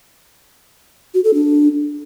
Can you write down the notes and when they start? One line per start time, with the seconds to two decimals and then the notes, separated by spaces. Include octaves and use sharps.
1.14 F#4
1.24 A4
1.34 D4